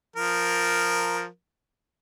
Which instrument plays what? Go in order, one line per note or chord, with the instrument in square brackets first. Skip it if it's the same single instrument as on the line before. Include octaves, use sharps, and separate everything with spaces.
[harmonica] F3 A#4